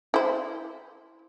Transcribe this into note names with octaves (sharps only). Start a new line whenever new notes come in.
E4 C5